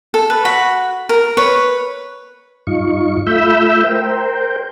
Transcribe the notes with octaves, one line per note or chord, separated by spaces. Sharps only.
A4
B4
F#4 B5
A#4
B4 C#5
G2 D#4 F4 C#6
A3 F4 E5 B5 E6 G6
A#4 C5 G5